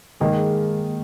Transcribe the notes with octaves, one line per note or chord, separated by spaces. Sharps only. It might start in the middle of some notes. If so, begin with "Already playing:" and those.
D#3 G#3 A#3